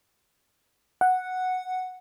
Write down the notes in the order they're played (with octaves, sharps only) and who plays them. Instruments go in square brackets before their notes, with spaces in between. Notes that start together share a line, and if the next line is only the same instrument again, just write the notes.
[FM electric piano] F#5